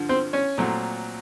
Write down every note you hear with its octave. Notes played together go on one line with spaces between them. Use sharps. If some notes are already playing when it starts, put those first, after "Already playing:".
Already playing: G2 D3 F3
C4 C5
C#4 C#5
A#2 F#3 A3 C4